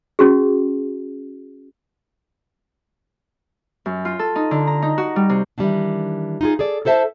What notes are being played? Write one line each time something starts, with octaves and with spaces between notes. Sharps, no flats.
C#4 F#4 G#4
F#2
F4
A4
D#4
D3
A#5
D#4
F#4
G3
C3
D#3 E3 G3 A3 C4 D4
D#4 F4 G#4
G#4 A4 D5
E4 A4 C5 E5 A5